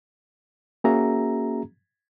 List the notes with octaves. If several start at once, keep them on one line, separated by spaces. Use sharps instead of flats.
A#3 C#4 F#4 G#4 E5 A#5